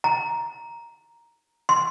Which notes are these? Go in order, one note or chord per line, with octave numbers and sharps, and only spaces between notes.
A#5
C6